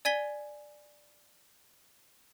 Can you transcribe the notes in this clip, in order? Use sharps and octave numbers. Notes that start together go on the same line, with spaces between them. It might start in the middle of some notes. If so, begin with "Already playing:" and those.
D5 G#5 G#6 B6 G7